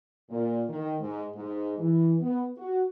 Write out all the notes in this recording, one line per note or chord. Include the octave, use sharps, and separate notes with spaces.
A#2
D#3
G#2
G#2
E3
B3
F#4